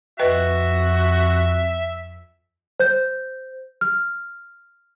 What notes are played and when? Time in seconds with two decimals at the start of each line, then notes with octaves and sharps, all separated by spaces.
0.19 F2 F#4 B4 D#5 E5 G5
2.80 C5 G6
3.81 F6